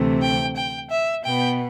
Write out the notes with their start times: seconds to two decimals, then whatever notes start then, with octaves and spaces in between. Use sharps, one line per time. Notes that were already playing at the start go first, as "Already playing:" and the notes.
Already playing: D2 C3 E3 A3 C4
0.21 G5
0.55 G5
0.90 E5
1.24 B2 B3 G5